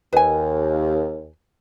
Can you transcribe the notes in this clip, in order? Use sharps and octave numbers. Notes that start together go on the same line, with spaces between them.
D#2 B4 G#5